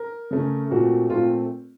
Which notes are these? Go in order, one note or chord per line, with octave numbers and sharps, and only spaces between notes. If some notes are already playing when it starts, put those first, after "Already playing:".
Already playing: A#4
C#3 A3 C#4
A#2 A3 C4 F#4
A#2 A3 C4 F4